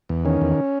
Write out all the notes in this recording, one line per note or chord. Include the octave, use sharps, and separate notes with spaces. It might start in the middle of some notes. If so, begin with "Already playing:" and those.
E2
D#3 C#4
E2